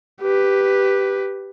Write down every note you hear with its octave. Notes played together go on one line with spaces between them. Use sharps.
G4 B4